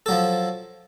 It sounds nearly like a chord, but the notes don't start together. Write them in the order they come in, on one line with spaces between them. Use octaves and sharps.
A4 F#3 F3